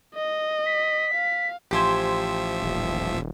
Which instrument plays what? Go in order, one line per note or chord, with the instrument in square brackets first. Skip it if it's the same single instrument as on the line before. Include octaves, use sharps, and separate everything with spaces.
[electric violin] D#5
[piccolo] B6
[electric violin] F5
[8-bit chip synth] A1 F3 E5 [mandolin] G4 C5 G#5
[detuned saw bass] D#1